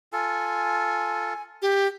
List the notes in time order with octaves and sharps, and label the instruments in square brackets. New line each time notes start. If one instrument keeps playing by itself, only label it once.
[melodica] F4 A4 [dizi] G#5
[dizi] G4